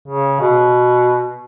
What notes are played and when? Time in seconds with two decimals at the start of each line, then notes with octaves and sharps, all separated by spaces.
0.08 C#3
0.40 B2